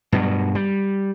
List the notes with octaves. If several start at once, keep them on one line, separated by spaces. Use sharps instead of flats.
G2 B2 F#3
G3